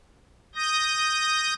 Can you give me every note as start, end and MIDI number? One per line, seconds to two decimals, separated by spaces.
0.55 1.54 87
0.55 1.54 91
0.55 1.54 94